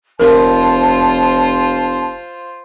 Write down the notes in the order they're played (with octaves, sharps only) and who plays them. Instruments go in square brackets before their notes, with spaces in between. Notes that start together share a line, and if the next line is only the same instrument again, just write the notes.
[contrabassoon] F1 [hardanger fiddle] F4 C5 [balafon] A#4 [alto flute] A5